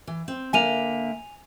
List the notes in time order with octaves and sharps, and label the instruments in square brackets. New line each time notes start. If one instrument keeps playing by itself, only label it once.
[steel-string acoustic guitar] E3
C4
[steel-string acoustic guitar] D3 A#3 E5 [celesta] G#5 D#7 F7